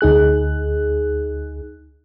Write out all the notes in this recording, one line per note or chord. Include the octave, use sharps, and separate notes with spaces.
D2 D#4 G#4 F#6